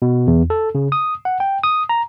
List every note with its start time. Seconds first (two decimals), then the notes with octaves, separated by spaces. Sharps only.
0.02 B2
0.27 E2
0.50 A4
0.75 C#3
0.92 D#6
1.25 F#5
1.40 G5
1.63 D#6
1.89 A#5